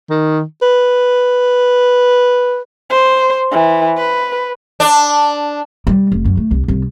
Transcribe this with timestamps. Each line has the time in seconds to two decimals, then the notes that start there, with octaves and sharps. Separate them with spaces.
0.10 D#3
0.62 B4
2.90 C5
3.51 E3
3.97 B4
4.80 D4
5.87 G3
6.12 F1
6.25 F#2
6.37 A3
6.51 C2
6.68 C2